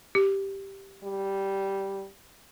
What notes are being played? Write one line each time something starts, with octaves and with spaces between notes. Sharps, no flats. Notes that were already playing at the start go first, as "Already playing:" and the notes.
G4
G3